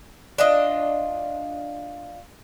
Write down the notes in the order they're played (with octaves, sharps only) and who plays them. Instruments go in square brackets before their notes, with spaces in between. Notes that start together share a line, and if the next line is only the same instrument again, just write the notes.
[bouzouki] D4 F4 D#5